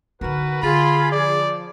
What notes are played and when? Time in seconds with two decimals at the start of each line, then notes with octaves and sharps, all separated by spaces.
0.21 D3 D#4 F#4 A#4 B4
0.63 D3 F4 G#4 B5
1.12 F3 D5